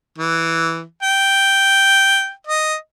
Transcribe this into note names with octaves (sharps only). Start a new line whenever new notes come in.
E3
G5
D#5